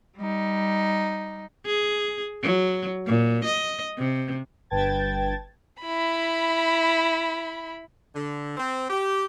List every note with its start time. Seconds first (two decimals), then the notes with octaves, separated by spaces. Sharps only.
0.16 G3 D#4
1.66 G#4
2.43 F#3
3.07 A#2
3.45 D#5
3.98 C3
4.70 G1 B4 G5 A5 G#6 A6
5.81 E4 B5
8.15 D3
8.57 C4
8.90 G4